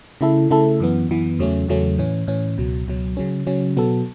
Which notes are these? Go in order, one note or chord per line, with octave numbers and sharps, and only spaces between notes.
C#3 A3 E4 A4
C#3 A3 E4 A4
F#2 E3 B3
F#2 E3 B3
E2 C#3 F#3 A3 C#4
E2 C#3 F#3 A3 C#4
A2 E3 C#4
A2 E3 C#4
C#2 B2 F#3
C#2 B2 F#3
C#3 F#3 C#4
C#3 F#3 C#4
B2 F#3 B3 A4